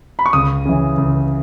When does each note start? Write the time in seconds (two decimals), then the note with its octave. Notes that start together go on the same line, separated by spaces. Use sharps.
0.19 B5
0.26 C#6
0.33 C#2 D#6
0.65 C#3 E3
0.98 C#2